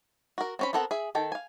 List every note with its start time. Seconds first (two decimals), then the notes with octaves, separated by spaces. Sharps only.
0.38 F#4 A#4
0.59 C4 C#4 B5
0.73 B3 C4 A4 A#4 F#5
0.91 G#4 E5
1.15 D#3 A4 G5
1.32 F5 G#5